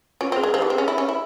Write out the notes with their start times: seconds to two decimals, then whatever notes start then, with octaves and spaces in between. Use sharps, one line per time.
0.21 C#4 F4
0.32 C4
0.36 G#4
0.42 G#3 A#4
0.54 F3 G4
0.62 E3
0.70 C4 G#4
0.78 C#4
0.87 E4 A#4
0.98 C#4
1.09 E4